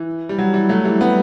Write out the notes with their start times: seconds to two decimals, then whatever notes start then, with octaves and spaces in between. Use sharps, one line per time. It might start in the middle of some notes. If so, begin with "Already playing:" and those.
Already playing: E3
0.29 G3
0.38 F#3
0.53 E3 G3
0.69 F#3 A3
0.84 E3 G3
1.00 G3 B3